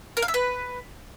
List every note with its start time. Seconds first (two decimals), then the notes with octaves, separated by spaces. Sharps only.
0.17 A#4
0.22 F5
0.28 E5
0.34 B4